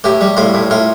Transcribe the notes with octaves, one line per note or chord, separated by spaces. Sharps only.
A2 G4
G3
A2 F4
A2
A2 F4